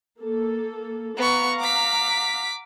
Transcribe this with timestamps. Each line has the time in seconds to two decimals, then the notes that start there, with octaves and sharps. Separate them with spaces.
0.18 A#3 A4
1.17 B3 F5 F#5 A#5 C#6
1.60 D6 B6